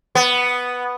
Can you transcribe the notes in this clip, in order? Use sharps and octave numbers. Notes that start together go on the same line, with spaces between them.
B3